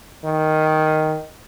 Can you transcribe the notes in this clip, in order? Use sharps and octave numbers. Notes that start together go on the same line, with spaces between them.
D#3